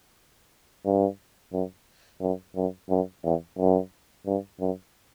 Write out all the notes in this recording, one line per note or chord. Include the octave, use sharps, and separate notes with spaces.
G2
F#2
F#2
F#2
F#2
E2
F#2
G2
F#2